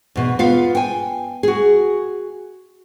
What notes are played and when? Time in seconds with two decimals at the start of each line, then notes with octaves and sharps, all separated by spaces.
0.16 E2 B2
0.39 B3 F4 F5
0.75 G5 G#5
1.43 F#4 G#4